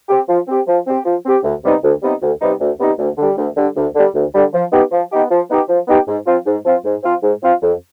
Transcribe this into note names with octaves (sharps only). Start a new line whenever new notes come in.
C4 G4
F3
C4 G4
F3
C4 G4
F3
C4 G4
D2
C3 G3 B3 D#4
D2
C3 G3 B3 D#4
D2
C3 G3 B3 D#4
D2
C3 G3 B3 D#4
D2
D3 G3
D2
D3 G3
D2
D3 G3
D2
D3 G3
F3
B3 D#4 G4
F3
B3 D#4 G4
F3
B3 D#4 G4
F3
B3 D#4 G4
G#2
F3 C4 F4
G#2
F3 C4 F4
G#2
F3 C4 F4
G#2
F3 C4 F4
F2